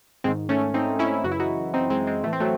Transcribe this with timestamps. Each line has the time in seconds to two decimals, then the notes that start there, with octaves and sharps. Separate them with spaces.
0.24 G#2 D#3 G#3 C4
0.49 A3 C#4
0.74 C4 D#4
0.99 C#4 E4
1.24 F#2 C#3 E3 F#4
1.32 E4
1.40 D#4 F#4
1.74 C4 D#4
1.90 G#3 C4
2.07 G#3 C4
2.24 A2 E3 A3
2.33 C4
2.40 F#3 A3